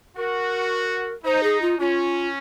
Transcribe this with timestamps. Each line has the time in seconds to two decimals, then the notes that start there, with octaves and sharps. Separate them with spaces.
0.16 F#4 A#4
1.24 D#4 C5
1.43 G#4
1.61 F4
1.79 C#4 F4